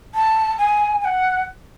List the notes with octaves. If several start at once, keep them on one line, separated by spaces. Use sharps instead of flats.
A5
G#5
G#5
F#5